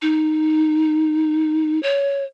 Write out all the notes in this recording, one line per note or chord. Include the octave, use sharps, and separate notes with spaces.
D#4
C#5